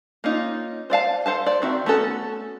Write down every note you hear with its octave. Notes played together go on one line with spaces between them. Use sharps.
A#3 C#4 D#4 F4
C5 D5 F5 A5
A4 C5 F5 A5
C5 D5
D#3 C4 F#4 E5
A3 B3 C#4 F#4 A4